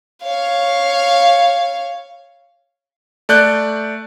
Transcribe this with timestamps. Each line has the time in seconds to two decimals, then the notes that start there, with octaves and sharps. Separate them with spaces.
0.23 C#5 F5
3.29 A3 D5 F#6 G6